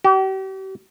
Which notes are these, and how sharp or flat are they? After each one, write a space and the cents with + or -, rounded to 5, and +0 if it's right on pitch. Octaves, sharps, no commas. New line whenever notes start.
G4 -40